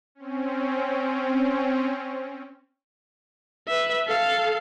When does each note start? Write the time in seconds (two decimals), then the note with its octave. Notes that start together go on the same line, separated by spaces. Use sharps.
0.15 C4 C#4
3.68 B4 E5
4.07 A4 F5